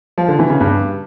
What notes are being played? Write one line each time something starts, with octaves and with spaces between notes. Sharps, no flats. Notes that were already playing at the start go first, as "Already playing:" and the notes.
F3
D3
E3
C#3
G2